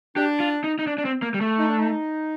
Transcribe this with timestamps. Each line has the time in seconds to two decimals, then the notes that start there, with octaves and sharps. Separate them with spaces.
0.16 D4 G4
0.40 F4
0.64 D#4
0.79 D#4
0.87 D4
0.98 D4
1.05 C4
1.22 A#3
1.34 G3
1.41 A3
1.58 D#4
1.68 D4
1.78 D#4